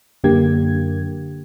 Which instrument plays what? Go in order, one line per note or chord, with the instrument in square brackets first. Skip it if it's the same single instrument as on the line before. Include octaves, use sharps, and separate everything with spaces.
[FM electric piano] F#2 D3 A#3 G4 G#6